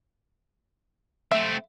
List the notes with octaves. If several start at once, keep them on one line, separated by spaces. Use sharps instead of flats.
A3 C4 E5